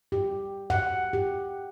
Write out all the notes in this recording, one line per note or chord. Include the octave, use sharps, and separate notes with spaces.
G4
F#5
G4